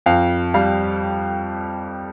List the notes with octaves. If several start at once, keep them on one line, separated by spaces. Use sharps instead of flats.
F2 F5
G3 F5